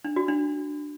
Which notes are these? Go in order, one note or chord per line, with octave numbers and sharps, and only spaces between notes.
D4
F#4
D4